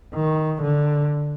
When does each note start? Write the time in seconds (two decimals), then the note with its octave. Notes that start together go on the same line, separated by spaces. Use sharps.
0.14 D#3
0.62 D3